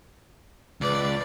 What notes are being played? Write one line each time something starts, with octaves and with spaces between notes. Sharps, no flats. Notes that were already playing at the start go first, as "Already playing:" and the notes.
C#2 B4 D5